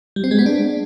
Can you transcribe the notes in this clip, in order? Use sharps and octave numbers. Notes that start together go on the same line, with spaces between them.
G3
C4
G#3
B3
D4